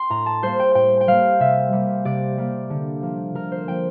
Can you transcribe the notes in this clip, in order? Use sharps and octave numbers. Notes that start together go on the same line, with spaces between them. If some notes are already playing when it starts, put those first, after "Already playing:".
Already playing: G5 C6
A2 A#5
A5
G3 A#3 C5
G5
A2 G5
G5
G3 A#3 F5
C3 E5
G3 A#3
C3 D5
G3 A#3
D3
F3 A#3
D3 A#4
C5
F3 A#3 G5